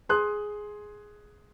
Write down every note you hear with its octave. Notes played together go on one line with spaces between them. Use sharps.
G#4 C6 D#6 F#6